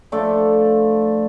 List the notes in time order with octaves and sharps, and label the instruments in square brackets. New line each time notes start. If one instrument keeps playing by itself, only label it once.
[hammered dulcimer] F3 A3 D4